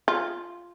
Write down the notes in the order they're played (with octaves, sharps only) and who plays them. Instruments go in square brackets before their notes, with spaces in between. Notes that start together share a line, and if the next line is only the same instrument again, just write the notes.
[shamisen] F4